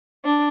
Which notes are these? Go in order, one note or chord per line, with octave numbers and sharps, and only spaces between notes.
D4